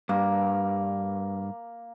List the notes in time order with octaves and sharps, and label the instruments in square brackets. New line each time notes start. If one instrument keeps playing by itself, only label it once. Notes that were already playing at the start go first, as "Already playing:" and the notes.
[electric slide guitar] G2 [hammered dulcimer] A#3